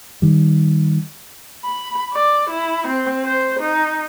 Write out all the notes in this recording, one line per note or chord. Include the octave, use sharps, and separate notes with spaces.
D#3 G3
B5
D5
E4
C4
C5
D#4